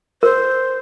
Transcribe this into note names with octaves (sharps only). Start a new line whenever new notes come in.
A#4 C5